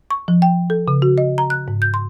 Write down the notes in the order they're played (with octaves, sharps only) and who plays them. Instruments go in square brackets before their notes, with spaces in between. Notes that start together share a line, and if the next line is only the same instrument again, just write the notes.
[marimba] C#6
F3
G5
A4
C#3
F#4
D#5
A#5
F#6
G#2
G6
C6